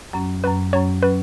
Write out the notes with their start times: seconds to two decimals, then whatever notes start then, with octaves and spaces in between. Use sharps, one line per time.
0.13 F#2 F#3 C#4
0.44 F#2 F#3 C#4 B4
0.73 F#2 F#3 C#4 C#5
1.03 F#3 C#4 B4